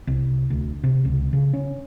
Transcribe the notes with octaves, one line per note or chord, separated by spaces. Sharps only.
C2
D2
C3
C#2
C#3
C#4